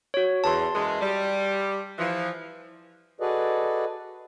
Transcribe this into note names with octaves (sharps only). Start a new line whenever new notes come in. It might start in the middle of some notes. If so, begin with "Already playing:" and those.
F#4 C#5
E2 A5 C6
F#2 E3 G#3
G3
E3 F3
F#4 G#4 A4 B4 D5 D#5